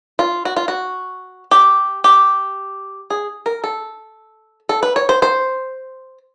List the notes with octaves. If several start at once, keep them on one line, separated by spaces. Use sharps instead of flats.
F4
F#4
F4
F#4
G4
G4
G#4
A#4
A4
A4
B4
C#5
C5
C5